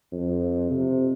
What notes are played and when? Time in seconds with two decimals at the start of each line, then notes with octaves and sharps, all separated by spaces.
0.12 F2
0.71 C3